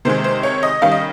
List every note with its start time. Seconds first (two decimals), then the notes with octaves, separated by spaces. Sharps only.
0.05 C3 D#3 G#3 C5
0.24 C5
0.43 C#5
0.63 D#5
0.82 D#3 G3 C#4 F5
0.92 D#5